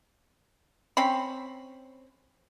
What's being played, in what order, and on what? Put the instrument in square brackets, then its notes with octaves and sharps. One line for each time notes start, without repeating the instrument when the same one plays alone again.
[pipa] C4 C#4 B5